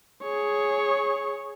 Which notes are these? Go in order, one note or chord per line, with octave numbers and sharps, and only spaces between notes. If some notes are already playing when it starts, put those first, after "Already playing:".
G#4 C#5